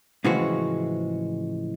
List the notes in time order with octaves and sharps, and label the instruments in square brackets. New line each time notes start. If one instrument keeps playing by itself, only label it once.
[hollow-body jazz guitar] A2 C#3 E3 F3 G#3 F#4